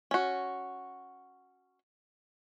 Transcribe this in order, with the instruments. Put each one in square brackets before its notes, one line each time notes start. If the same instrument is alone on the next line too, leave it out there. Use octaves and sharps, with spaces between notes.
[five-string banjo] C#4 F#4